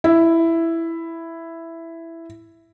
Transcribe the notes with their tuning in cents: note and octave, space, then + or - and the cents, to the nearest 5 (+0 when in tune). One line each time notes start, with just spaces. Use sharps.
E4 +5